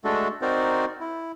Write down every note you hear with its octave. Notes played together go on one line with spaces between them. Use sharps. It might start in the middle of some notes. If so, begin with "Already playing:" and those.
G#3 A3 D4 F#4 A4
C4 D#4 F#4 A#4 C5 D5
E4